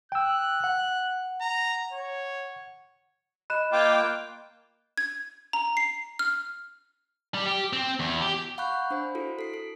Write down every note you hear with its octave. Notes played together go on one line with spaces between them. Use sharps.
G5 E6 F#6
F#5
A#5
C#5
D#5 B5 F#6 E7
A#3 F4 G5 D6
G#6
A#5
C7
F6
G3
G4
C4
E2
G4
F5 F#5 B5 C#6 F#6 G6
D4 C5 B5
E4 F#4 A4
A4 C7
A4